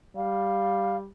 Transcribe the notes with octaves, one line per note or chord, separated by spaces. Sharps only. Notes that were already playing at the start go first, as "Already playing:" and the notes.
G3 F5